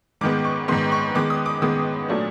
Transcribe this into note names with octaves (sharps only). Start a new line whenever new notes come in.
G#2 D#3 G#3 B3 D6
C#6
G#2 D#3 G#3 B3 C6
C#6
D#3 G#3 B3 D6
D#6
D6
D#3 G#3 B3 D#6
A#2 F#3 A3 D4